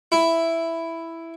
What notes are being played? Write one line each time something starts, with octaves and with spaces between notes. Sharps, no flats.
E4